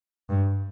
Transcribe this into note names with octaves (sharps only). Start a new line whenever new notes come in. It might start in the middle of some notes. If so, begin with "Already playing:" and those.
G2